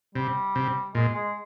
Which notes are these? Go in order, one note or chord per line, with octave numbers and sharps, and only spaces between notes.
C3 G3
C3
A#2 G#3
G#3